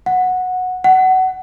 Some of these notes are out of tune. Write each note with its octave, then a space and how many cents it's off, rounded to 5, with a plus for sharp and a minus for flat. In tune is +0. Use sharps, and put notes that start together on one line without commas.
F#5 -10
F#5 +20